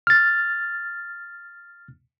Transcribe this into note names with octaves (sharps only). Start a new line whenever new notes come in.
F6 A6